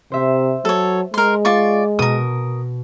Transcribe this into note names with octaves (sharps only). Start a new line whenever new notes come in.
C3 C5 E5
F#3 A4 C#5
G#3 A#4 C6
F4 D5 C#6
B2 A#4 D#6